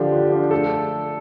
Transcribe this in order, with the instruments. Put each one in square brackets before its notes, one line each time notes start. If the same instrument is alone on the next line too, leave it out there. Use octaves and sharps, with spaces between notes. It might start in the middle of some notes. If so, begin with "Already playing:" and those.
Already playing: [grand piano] D3 F3 D4 [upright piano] G4
[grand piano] F4
D4
[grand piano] A3 [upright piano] A4